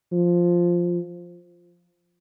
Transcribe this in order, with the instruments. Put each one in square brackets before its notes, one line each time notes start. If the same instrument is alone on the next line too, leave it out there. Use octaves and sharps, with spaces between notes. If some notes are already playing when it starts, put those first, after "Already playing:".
[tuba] F3